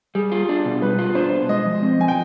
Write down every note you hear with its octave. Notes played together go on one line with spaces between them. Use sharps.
G3 G#4
F4
D4
B2
G3 B4
F4
D4 C5
B2
G#3 D#5
F3
C4
F3 G#5
G5